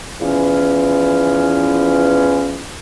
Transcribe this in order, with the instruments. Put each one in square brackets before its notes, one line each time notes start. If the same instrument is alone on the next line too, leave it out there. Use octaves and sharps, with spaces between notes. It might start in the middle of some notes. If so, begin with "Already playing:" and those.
[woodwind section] E2 E3 F3 C#4